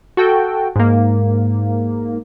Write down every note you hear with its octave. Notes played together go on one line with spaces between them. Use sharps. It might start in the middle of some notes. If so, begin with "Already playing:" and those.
F#4 A4 G5
G#2 A#3